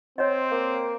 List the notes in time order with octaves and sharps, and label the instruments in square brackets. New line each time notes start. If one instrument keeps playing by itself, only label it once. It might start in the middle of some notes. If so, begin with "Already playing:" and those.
[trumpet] C4 [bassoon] C5 [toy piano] C#5 D#5
[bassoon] A#3